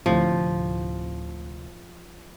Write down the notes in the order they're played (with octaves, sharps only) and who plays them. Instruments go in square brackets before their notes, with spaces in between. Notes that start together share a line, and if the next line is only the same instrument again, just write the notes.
[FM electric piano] D2 A2 C3 [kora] F3